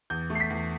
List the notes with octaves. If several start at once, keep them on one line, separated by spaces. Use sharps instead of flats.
E2 G6
A3
C7
B6
E2